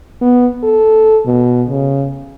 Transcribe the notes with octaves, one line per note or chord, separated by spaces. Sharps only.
B3
A4
B2
C#3